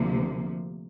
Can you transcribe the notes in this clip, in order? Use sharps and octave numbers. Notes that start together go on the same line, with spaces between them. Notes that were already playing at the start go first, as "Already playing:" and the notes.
Already playing: D2 C3 F3 A#3